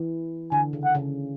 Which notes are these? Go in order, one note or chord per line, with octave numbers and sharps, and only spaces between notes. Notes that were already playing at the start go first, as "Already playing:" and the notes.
Already playing: E3
D3 G#5
C#3
F#5
C#3